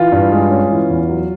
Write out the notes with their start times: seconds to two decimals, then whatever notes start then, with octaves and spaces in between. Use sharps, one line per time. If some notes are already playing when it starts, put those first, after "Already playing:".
Already playing: E3 F4
0.12 G2
0.32 G#3
0.51 C#4
0.71 E3
0.90 E2
1.10 F#3